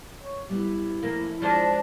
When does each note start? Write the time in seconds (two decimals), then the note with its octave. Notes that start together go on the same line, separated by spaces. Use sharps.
0.20 C#5
0.49 G3 B3 E4
1.03 F2 A#3 C#4 A5
1.42 F3 G#3 D4 C5